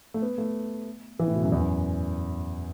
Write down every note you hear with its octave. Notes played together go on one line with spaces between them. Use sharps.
A3
B3
A3
E3
A2
B2
F#2
E2
F#2